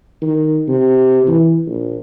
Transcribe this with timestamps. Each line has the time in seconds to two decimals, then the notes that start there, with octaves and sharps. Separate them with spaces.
0.22 D#3
0.68 C3
1.27 E3
1.66 A#1